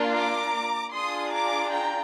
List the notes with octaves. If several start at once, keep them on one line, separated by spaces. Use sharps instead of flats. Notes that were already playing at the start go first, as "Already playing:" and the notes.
Already playing: A#3 D4 F4
A#5 D6
D4 F4 G#4 C6 D#6
A#5 D6
G5 A#5